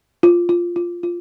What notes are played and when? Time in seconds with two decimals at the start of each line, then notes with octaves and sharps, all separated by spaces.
0.23 F4
0.49 F4
0.76 F4
1.03 F4